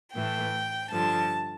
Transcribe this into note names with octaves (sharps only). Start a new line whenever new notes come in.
A2 E3 A3 G5
G2 D3 F3 A5